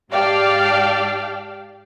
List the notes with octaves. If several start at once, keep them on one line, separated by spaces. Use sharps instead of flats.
G#2 G4 D5 F5 G5 A5